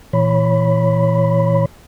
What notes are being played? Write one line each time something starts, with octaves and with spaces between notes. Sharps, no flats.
A#2 E3 C#5 B5